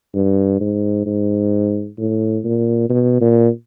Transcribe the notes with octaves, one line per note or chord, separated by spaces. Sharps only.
G2
G#2
G#2
A2
A#2
B2
A#2